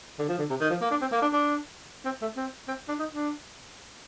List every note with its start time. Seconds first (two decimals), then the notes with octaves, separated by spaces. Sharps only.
0.19 D3
0.29 F3
0.39 D3
0.50 C3
0.61 D#3
0.70 F3
0.81 A#3
0.91 D4
1.01 C4
1.12 A#3
1.22 D4
1.33 D4
2.05 C4
2.22 A3
2.37 C4
2.68 C4
2.88 D4
2.99 D#4
3.15 D4